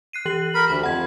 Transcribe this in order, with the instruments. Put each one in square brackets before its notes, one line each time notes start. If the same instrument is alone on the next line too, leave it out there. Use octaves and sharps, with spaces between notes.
[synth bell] F#6 C7 D#7
E3 G4 F#7
[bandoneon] A#4 B5
[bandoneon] D2 [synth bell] B5
[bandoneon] F2 [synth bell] F#5 G#6